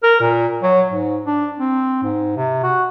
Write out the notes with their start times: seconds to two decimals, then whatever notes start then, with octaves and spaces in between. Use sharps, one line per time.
0.03 A#4
0.21 A#2
0.63 F#3
0.90 G#2
1.26 D4
1.59 C4
2.03 G#2
2.37 C3
2.63 F#4